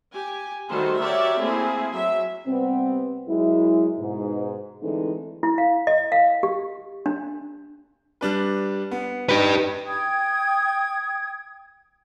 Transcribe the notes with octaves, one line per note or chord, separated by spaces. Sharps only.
G4 G#5
D#3 G3 A3 F#4 A4 C5
F#4 G4 A#4 C#5 D5 E5
A3 A#3 C4 E4 G#4
F#3 E5
C3 G3 B3 C4
F#2 F#3 G#3 E4
G#2 B2
D3 E3 G#3 A3 C4 D#4
E4
F5
D#5
F5
G4
D4
G3 D4 B4
B3
D#4 G4 B4
G5 D#6 G#6